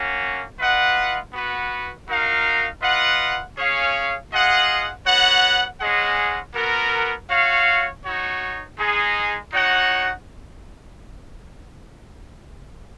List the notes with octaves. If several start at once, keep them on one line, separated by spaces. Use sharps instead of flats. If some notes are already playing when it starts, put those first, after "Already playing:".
Already playing: A#3 C#4 F#4
F4 B4 D#5 F#5
B3 F#4 B4
D#4 F#4 A#4 F5
F4 B4 D#5 F#5
C#4 G#4 C#5 F5
F4 G#4 D#5 F#5
B3 F#4 C#5 F#5
G#3 C#4 G#4 D#5 F#5
B3 F#4 A#4
F#4 C#5 F5
D#4 F#4 C#5
G#3 D#4 G#4
D#4 F#4 C#5 F#5